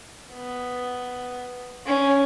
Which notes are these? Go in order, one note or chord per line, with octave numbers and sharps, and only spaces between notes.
B3
C#4